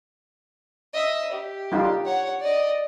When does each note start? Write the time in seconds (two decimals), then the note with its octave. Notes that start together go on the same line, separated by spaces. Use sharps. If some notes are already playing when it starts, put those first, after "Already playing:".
0.93 D#5 E5
1.32 G4
1.72 G3 D#4 F4
2.04 C#5 F#5
2.40 D5 D#5